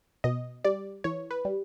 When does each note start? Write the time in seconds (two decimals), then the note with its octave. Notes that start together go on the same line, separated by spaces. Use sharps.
0.24 B2 D#5
0.64 G3 D5
1.04 E3 C#5
1.31 B4
1.45 G3